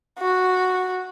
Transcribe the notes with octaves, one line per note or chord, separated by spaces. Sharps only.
F#4